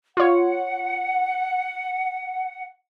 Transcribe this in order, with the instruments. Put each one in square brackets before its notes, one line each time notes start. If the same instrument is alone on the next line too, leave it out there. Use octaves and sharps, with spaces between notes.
[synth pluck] F4 C#5 [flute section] F#5